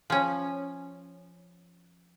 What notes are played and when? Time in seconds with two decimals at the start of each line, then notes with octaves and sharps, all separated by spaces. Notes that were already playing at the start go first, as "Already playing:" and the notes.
0.10 F3 C#4